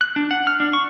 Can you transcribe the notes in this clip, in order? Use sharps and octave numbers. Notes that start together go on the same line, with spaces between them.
F#6
D4
F#5
F6
D4
C#6